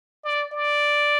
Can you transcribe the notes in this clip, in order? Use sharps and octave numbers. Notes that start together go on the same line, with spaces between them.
D5
D5